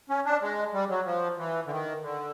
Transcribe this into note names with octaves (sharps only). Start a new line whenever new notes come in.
C#4
D4
G#3
G3
F#3
F3
E3
D3
D#3
D3